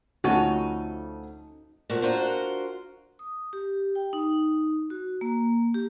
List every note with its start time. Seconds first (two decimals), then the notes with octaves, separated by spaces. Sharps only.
0.24 D2 F3 C#4 D#4 F#4 A4 D#7
1.90 A#2 A3 F#4 A#4 C5
2.02 D4 F4 F#4 A#4 C5
3.19 D#6
3.53 G4
3.95 G5
4.13 D#4
4.90 F#4
5.21 A#3
5.74 G4